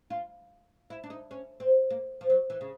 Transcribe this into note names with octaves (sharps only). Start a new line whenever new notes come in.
F4
E4
D4
D#4
C#4
C4
A#3
F3
F#3
E3
C#3